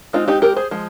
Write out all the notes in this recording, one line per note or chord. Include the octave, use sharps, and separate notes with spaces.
G#3 C4 D#4 F4
D#4 G4
G4 A#4
G#4 C5
F3 G#3